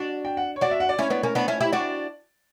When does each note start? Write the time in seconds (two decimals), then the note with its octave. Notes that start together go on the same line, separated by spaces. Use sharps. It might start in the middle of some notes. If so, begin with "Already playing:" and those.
Already playing: D4 F#4
0.25 G5
0.37 F#5
0.56 C#5
0.61 D4 F#4 D5
0.71 E5
0.80 F#5
0.89 D5
0.99 C#4 E4 C#5
1.10 B3 D4
1.23 A#3 C#4
1.35 B3 D4
1.48 C#4 E4
1.61 E4 G4
1.72 D4 F#4 D5